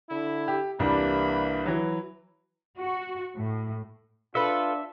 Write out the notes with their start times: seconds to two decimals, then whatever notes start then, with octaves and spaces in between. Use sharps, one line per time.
0.10 D3 E4
0.48 G4
0.79 C2 E3 G3 A#3 D4 B5
1.65 E3 F#3
2.79 F#4
3.37 A2
4.35 D4 F4 A4 B4 E5